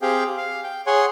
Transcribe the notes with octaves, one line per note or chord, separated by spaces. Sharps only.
C4 G4 G#4 F5 G5
F5
G5
G#4 C#5 F#5 G#5 C6